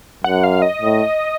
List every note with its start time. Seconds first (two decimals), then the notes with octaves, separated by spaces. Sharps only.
0.24 F#2 F#5
0.44 F5
0.62 D#5
0.82 A2